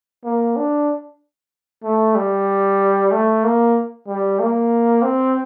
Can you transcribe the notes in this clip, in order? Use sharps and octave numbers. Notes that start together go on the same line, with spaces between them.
A#3
D4
A3
G3
A3
A#3
G3
A#3
C4